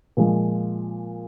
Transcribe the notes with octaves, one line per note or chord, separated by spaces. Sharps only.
A#2 F3 G#3